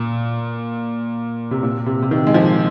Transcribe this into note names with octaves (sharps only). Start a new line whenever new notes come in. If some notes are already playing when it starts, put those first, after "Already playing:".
Already playing: A#2
C3
A#2
C3
C3
D#3
G#3
F3